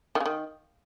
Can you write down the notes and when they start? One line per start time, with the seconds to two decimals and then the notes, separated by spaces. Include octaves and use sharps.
0.15 D#3
0.20 C#3
0.26 D#3